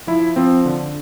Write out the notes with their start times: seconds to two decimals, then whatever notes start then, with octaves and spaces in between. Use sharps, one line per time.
0.07 F3 E4
0.36 F3 C4
0.66 D3